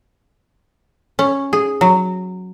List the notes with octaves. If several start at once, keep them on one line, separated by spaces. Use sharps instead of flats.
C#4
G#4
F#3